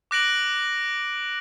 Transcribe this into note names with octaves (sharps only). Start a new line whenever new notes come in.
D6 F#6 A#6 D7 F#7